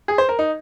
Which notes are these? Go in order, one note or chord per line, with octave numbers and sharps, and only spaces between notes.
G#4
C5
A#4
D#4